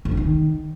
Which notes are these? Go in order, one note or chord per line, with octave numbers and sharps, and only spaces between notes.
F2
F3
D#3